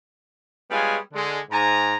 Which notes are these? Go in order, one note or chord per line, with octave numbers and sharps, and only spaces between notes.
G3 G#3 B3 F4 C#5 G#5
D3 G#3
G#2 G#5 A#5